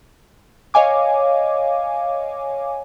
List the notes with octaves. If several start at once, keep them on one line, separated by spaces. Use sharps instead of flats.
C#5 D#5 F5 G#5 D6